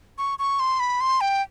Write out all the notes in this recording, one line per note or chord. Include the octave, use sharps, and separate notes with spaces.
C#6
C#6
C6
B5
C6
G5